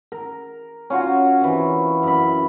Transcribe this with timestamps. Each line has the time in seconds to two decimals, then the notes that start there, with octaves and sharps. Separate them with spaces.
0.12 A#4
0.90 C#4 F4 F#4
1.41 C3 E3
2.03 F#2 B5